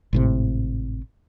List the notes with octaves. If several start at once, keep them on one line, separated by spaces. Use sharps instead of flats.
G#1 A2 C3